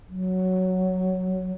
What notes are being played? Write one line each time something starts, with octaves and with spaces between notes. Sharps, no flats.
F#3